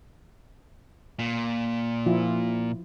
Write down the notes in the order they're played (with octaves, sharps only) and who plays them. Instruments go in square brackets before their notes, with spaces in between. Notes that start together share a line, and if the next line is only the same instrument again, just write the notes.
[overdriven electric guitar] A#2
[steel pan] F3 E4 F4